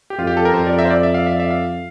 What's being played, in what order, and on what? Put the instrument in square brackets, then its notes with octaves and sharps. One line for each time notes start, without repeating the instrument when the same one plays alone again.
[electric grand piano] G4
[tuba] F2 [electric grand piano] F4
[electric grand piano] G4
A4
A#4
[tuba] F2 [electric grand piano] C5
[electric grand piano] D5
E5
C5
D5
E5
F5
E5
E5
F5